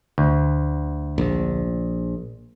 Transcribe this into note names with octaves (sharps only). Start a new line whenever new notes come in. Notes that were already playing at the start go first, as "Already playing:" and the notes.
D2
A#1